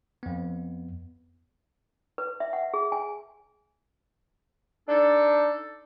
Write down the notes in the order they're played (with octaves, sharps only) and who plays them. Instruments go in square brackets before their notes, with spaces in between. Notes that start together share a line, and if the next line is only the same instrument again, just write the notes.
[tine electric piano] F2 B3
[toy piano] B4
E5
F#5
G#4
G#5
[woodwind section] D4 D#4 A4